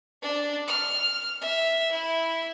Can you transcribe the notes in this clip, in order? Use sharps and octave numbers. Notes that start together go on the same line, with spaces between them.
D4
F6
E5
E4